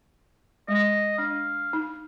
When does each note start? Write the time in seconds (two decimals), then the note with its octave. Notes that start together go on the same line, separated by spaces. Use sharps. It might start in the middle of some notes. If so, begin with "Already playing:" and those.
0.68 G#3 D#5
1.18 D4 F5
1.73 D#4